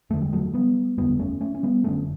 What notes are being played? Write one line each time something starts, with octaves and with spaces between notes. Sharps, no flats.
F#1 E2 D3 A3
G3
F#3 A3
G3 B3
F#1 E2 D3 G3 B3
A3 C#4
A3 C#4
C#4
G3 B3
F#1 F#2 D3 A3 C#4